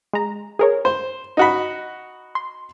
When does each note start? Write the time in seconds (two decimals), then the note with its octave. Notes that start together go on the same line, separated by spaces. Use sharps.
0.13 G#3 A#5
0.59 G#4 A#4 C#5
0.85 C5
1.37 D#4 F#4 B5
2.35 C6